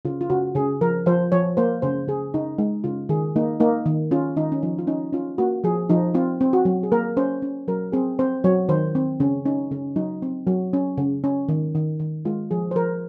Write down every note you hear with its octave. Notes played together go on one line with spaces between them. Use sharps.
C#3 F4
F4
C#3 F#4
C#3 G#4
F3 A#4
F3 C5
F3 C#5
A#3 C5
C#3 C5
C#3 G#4
C#3 D#4
G#3 D#4
C#3 F4
D#3 G#4
A#3 D#4
A#3 D#4
D#3
C#4 F4
D#3 D#4
C#4
F3 D#4
F4
C#4 D#4
C#4 F4
A#3 F#4
F3 G#4
F3 D#4
C4 F4
C4
F#4
F#3
G#4
A#3 A#4
C#4 C5
C#4
F#3 A#4
C4 G#4
C4 C5
F#3 C#5
D#3 C5
C4
C#3 C#4
C#4 D#4
C#3 C#4
F#3 D#4
C4
F#3
C#4
C#3
C#4
D#3
D#3
D#3
G#3 F4
F3 G#4
C5
F3 A#4